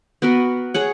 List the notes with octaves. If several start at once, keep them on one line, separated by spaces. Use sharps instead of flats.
B3 F#4 A#4 B4
G#4 C#5 F#5